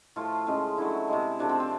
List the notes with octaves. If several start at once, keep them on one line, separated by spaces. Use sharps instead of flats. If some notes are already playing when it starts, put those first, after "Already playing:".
A2 F3 A3 F4
C#3 F3 G#3
D3 F#3 A3 E4
C3 E3 G#3
C3 F3 A3 D4
C4
C4